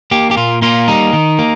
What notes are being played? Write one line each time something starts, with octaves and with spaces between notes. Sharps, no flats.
A#3 G4
G4
A#2 F4
A#3 F4
G3 D#4
D#3
A#3